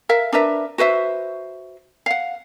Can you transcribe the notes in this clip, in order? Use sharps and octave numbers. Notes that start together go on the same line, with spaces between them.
A#4 E5 F5
D4 A#4 B4 E5
F#4 B4 C5 E5
F5 F#5